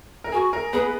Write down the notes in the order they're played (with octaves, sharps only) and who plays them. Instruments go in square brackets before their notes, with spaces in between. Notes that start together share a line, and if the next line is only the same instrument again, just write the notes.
[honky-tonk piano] A#4
[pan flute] F#4 [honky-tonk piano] G#4
[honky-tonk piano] A#4
[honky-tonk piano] B3 B4 [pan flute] G#4